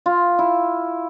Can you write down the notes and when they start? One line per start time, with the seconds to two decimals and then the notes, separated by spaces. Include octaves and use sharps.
0.06 F4
0.39 E4